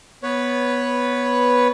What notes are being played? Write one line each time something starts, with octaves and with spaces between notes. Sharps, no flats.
B3 B4 C#5